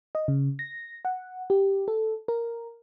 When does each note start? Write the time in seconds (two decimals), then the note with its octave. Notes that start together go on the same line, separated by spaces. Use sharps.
0.15 D#5
0.28 C#3
0.59 A#6
1.05 F#5
1.50 G4
1.88 A4
2.28 A#4